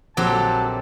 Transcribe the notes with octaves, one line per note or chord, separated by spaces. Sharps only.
A#1 F#3 C4 G4 A4 A5